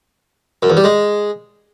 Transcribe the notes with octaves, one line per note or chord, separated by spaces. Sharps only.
F#2
E2
G3
G#3